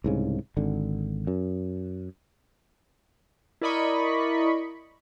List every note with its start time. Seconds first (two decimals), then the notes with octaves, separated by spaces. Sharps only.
0.04 C2 G#2 C#3
0.57 G#1 D3
1.27 F#2
3.61 E4 A#4 D5 D#5 B5 C#6